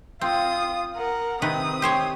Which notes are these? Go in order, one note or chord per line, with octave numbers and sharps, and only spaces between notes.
C4 F4 D#6
A#4 F#5
C3 D#3 C4 B4 D#6
G4 C5 C#5